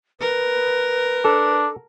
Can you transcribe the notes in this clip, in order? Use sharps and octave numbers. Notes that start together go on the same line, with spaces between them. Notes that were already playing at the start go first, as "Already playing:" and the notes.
A#4 B4
D4 A4